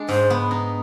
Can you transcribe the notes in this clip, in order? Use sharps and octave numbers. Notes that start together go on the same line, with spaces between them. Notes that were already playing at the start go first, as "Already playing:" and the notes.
Already playing: G#3 D4
G#2 C5
B3
D#4